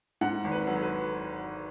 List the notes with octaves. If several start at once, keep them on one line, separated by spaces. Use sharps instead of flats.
G#2 F#5
G#1
B4
F#3
B4